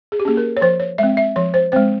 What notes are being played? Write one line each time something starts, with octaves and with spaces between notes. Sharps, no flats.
G#4
G4
A#3 C#4 G#4
A#4
C#5
F3 C5
C#5
G#3 C4 E5
E5
F3 C#5
C5
G#3 C4 C5